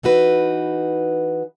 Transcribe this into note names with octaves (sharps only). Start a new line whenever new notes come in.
E3 D#4 F#4 B4